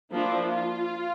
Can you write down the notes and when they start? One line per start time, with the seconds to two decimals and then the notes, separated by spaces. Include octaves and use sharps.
0.11 F3 A#3 D4 E4
0.49 F4